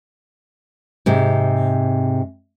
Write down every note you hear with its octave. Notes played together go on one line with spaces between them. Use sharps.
G#2 C3